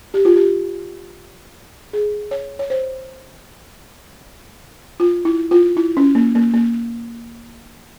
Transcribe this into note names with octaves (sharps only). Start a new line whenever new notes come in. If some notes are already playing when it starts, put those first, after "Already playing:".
G4
F4
G4
G#4
C#5
C#5
C5
F4
E4
F4
E4
C#4
A#3
A#3
A#3